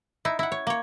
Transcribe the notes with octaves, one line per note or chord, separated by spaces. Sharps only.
D#4 E4
E4 F#5
C#5
A#3 C#5